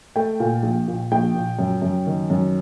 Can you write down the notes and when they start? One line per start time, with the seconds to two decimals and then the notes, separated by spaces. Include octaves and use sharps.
0.16 A3 G5
0.40 A#2
0.63 A#1
0.88 A#2
1.12 A#1 G5
1.35 A#2
1.59 F#2
1.82 F#2
2.06 D#3
2.30 F#2